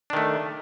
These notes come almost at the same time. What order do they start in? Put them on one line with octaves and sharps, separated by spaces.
D4 D#3 A3